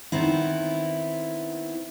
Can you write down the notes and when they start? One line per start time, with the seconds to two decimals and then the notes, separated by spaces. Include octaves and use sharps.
0.12 D#3 B3 C4 E4